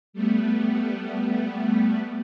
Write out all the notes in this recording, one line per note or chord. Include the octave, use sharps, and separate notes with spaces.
G3 A3 B3